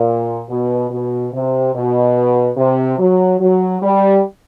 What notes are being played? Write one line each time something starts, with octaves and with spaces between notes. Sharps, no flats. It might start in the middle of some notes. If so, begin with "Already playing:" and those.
Already playing: A#2
B2
B2
C3
B2
C3
F#3
F#3
G3